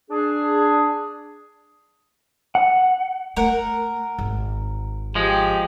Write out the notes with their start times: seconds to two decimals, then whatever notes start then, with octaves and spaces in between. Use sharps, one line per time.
0.10 D4 G#4
2.55 F#5
3.37 A3 A#4 F#5
4.18 G#1
5.15 F3 G#3 G4